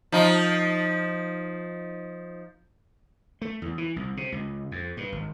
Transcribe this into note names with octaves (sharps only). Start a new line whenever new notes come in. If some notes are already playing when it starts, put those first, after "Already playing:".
F3 D#4
A3
E2
E3
C2
C3
C#2
F2
G2
G#1